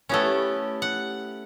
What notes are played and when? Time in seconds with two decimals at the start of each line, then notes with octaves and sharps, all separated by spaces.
0.09 A3 B3 C#4 E4 F4 G4
0.82 F#5